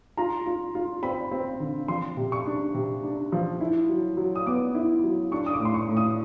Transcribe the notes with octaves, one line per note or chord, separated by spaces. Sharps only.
F4 A#5
F4
F4
C4 B5
C4
D3
F3 C6
C3
C#6
D4
C3
D4
F3
E4
F#3
F#3
D#6
B3 D6
E4
F#3
D4 C#6
D#6
D6
A2
C6
C#6
A2
D#6